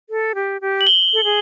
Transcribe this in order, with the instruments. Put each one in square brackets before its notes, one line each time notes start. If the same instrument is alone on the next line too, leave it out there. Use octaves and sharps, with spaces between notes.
[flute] A4
G4
G4
[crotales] F#7
G7
[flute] A4
G#4